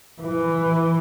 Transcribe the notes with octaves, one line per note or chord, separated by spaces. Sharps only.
E3